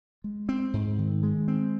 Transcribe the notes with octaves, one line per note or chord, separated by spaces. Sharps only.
G#3
C4
G#2
D#3
G#3
C4